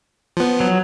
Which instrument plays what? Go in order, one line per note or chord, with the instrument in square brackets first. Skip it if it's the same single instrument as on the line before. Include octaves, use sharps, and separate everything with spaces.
[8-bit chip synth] F3 B3
[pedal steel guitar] F#3